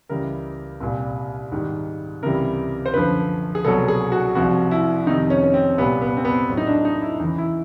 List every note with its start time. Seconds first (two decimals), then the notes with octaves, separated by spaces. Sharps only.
0.09 C#2 C#3 E3 G3 A#4
0.80 C2 A#2 G3
1.52 G#2 D#3 G3
2.23 C#2 C3 E3 G3 A#4
2.86 C5
2.94 F#2 D3 F3 B4
3.55 G#4
3.65 C2 B2 F#3 A4
3.88 G#4
4.12 F#4
4.35 C2 C3 F3 F#4
4.71 E4
5.07 D#3 D#4
5.09 F2 C3
5.30 C#4
5.44 C#4
5.54 C4
5.77 C2 A#2 G3 B3
6.01 B3
6.17 C4
6.25 B3
6.49 A2 F#3
6.57 D#4
6.67 D4
6.85 D#4
7.02 E4
7.19 E2 D#4
7.22 C#3 E3
7.38 E4